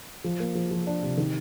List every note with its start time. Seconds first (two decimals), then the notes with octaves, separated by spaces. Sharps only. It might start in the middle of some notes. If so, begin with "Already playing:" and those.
0.24 F3
0.40 A#3
0.55 F3
0.71 F3
0.87 D4
1.03 C3
1.17 D#3